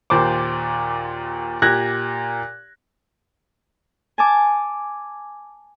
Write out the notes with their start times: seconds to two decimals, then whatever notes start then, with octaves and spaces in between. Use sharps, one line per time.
0.10 D#2 A#2 C5 D6
1.62 A#2 G4 F#6 G#6 A#6
4.18 G#5 A5 D6